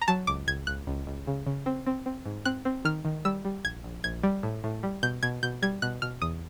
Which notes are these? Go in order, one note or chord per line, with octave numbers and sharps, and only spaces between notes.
A#5
F#3 A5
C#2 D6
C#2 G#6
C#2 F#6
C#2
C#2
C#3
C#3
C4
C4
C4
G#2
C4 F#6
C4
D#3 F6
D#3
G3 E6
G3
A#1 G#6
A#1
A#1 G#6
G3
A2
A2
G3
B2 G6
B2 G#6
B2 G6
G3 G#6
B2 F#6
B2 F6
E2 D#6